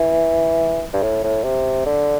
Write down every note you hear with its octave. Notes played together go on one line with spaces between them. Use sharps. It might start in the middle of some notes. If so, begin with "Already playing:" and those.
Already playing: E3
G2
A2
A2
C3
D3